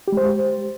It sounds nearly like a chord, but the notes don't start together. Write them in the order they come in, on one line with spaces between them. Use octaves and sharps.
G4 G#3 C5